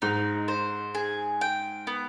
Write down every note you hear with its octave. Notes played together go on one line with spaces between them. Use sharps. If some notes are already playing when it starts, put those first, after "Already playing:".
G#2 D#4
C5
G#4
G5
B3